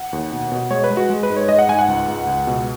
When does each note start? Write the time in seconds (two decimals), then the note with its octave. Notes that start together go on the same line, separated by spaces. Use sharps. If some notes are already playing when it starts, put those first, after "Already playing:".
Already playing: F#5
0.13 D#2
0.32 B2
0.52 B2
0.70 G#3 C#5
0.84 B4
0.91 G#3
0.97 F#4
1.10 G#3
1.23 B4
1.30 G#2
1.37 C#5
1.49 G#3 D#5
1.59 F#5
1.69 G#2 G#5
1.79 F#5
1.88 C#2
2.08 C#2
2.27 C#2
2.47 B2